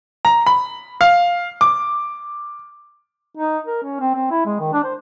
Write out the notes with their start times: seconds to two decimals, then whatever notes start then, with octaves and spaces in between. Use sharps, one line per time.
0.25 A#5
0.47 B5
1.01 F5
1.61 D6
3.37 D#4
3.67 A#4
3.82 C#4
4.00 C4
4.14 C4
4.31 E4
4.46 G#3
4.60 D#3
4.73 D4
4.84 C5